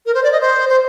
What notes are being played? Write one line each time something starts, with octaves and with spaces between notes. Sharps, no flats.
A#4
C5
D5
D#5
C5
C5